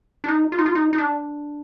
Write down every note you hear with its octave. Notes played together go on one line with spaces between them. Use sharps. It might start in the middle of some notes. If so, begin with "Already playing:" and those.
D4
D#4
F4
D#4
F4
D#4
D#4
D4